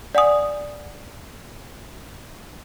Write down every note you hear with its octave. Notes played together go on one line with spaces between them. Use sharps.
D5 F#5 G#5 D#6